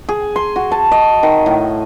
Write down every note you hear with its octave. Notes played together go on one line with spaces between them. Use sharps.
G#4
C6
F#4
A5
D#5
D#3
A2